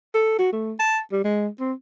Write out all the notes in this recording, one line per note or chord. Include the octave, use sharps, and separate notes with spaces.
A4
F#4
A3
A5
G3
G#3
C4